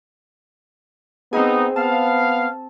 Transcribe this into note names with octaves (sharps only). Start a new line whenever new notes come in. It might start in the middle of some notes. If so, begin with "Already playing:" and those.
B3 C4 D#4 G#4
B3 F5 A5